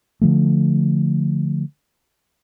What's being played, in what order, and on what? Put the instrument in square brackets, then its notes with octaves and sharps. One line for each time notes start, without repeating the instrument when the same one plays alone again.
[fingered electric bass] D3 F3 A3